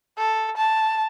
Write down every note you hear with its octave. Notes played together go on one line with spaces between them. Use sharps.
A4
A5